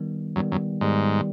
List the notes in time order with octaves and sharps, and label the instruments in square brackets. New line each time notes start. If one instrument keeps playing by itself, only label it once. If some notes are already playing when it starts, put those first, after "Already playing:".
Already playing: [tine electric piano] D#3 G3 B3
[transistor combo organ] F#2 [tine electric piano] D#3 G3 B3
[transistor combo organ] F#2
[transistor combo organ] G#2 [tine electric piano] D#3 G3 B3